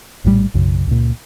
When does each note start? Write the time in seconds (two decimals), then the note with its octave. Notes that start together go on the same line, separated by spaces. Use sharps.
0.24 A#1 A2 D3 G3
0.54 B1 F#2 C#3
0.87 C#2 A#2